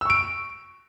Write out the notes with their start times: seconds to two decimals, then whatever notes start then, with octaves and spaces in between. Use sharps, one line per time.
0.01 E6
0.05 C#6
0.10 D7